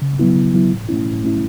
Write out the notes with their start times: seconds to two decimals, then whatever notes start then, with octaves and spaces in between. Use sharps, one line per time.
0.02 C#3
0.19 F#3 B3 E4
0.36 C#3
0.54 F#3 B3 E4
0.71 A2
0.89 A3 C#4 E4
1.06 A2
1.23 A3 C#4 E4